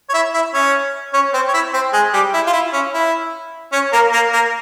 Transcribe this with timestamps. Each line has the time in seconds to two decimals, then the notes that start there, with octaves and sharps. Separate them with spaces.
0.09 C#5
0.14 E4 E5
0.34 E4 E5
0.54 C#4 C#5
1.13 C#4 C#5
1.34 C4 C5
1.48 C#5
1.54 E4 E5
1.73 C4 C5
1.93 G#3 G#4
2.13 G3 G4
2.34 E4
2.47 F4
2.53 E4
2.73 C#4
2.94 E4
3.72 C#4 C#5
3.93 A#3 A#4
4.13 A#3 A#4
4.33 A#3 A#4